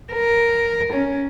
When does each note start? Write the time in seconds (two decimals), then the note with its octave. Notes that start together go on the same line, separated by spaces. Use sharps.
0.13 A#4
0.93 C#4